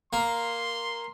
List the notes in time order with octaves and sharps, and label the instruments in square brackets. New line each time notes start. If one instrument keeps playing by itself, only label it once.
[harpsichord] A#3 [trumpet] C6